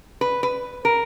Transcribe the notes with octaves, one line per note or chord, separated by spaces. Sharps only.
B4
B4
A#4